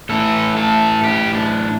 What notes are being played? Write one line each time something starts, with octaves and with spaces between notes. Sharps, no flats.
A2 E3 A4
A4
G4
D4